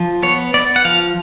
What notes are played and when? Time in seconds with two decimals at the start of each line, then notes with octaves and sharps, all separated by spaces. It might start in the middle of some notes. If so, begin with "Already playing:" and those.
Already playing: F3
0.23 B3 C#5
0.54 B3 D5
0.76 F#5
0.85 F3 F5